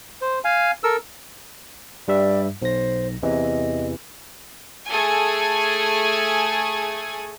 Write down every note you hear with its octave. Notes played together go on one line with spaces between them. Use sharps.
C5
F5 G#5
A4 A#4 E6
G2 G3 D5 E5
B1 C5 A#6
E2 C3 E3 D#5
A3 G#4 A4 G#5 G#6